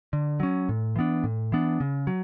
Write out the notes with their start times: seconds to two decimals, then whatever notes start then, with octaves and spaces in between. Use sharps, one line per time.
0.13 D3
0.40 F#3 C#4
0.69 A2
0.96 E3 B3 D4
1.24 A2
1.52 E3 B3 D4
1.80 C#3
2.07 F#3